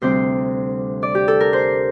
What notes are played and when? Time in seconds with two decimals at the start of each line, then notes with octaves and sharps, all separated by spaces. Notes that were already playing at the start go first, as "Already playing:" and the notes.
0.02 D2 C3 G3 C4 C5
1.03 D5
1.15 G4
1.28 A4
1.40 A#4
1.53 C5